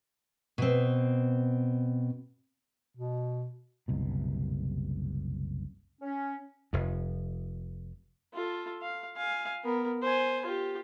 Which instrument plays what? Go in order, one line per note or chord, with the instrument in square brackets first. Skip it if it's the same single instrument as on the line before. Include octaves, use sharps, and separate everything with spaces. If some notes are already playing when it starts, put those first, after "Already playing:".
[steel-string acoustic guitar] B2 C4
[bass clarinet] B2
[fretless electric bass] F#1 C2 B2
[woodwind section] C#4
[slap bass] F1 F2
[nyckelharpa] F4 A4
F5
F5 G#5
B3 A#4
C5 G#5
F4 G4